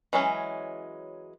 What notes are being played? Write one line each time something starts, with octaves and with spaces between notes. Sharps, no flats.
E3 F#3 G#3 C#4